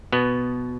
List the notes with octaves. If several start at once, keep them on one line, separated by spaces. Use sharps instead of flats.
B2 B3